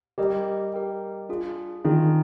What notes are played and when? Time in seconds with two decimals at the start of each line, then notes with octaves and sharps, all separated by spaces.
0.18 G3 G4 A#4 D#5 G5
0.74 G4 A#4 D#5 G5
1.29 D4 F4 G#4
1.85 D#3 D4 F4 G#4